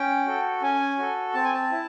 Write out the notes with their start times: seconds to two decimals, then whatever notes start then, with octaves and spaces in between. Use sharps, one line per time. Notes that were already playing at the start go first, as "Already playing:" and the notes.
Already playing: C#4 G5
0.26 F#4 A4
0.62 C#4 G#5
0.98 F#4 A4
1.34 C4 A5
1.44 G#5
1.54 A5
1.71 E4